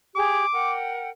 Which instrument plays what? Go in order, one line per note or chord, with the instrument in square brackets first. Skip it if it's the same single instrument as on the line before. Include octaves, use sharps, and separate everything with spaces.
[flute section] G4 G#4 [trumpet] D6
[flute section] A#4 F#5 G5